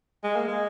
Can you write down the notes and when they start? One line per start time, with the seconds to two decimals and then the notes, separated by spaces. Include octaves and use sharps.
0.24 G#3
0.36 A#3
0.48 G#3